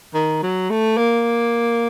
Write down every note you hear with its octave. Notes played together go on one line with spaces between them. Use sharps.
D#3
F#3
A3
A#3